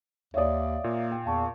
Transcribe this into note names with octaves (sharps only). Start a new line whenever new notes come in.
D#2 C#5 D5 E5 F5 D#6
A#2 A#3
G5
E2 F5 A5 C#6